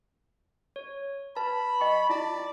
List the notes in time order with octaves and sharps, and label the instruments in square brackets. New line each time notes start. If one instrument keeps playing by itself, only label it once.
[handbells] C#5
[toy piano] B4 [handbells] A5 [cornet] B5
[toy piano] D#5 G5 C#6
[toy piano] E4 F4 A#5 [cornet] D5